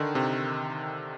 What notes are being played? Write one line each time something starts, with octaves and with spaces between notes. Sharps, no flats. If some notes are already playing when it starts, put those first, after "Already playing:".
Already playing: D3 D#3
C3